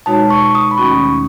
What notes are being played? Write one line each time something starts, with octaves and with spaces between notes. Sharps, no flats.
B2 G#3 D#4 F#4 C#5 A5
C#6
D#6
B5
D#2 D#3 A3 C#4 F#4 C#6